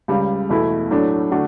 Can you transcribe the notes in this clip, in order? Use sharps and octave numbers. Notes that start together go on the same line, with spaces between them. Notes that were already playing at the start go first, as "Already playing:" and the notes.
C#2 C#3 G3
E2 B2 A3 E4
A2 F#3 A3 D4
D3 A3 D4 F#4